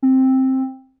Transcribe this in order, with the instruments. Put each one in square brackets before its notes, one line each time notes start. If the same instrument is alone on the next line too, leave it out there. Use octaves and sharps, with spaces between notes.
[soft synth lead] C4